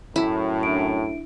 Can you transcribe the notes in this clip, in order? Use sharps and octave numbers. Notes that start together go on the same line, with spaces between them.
F#2 A2 E4
D4 E5 D7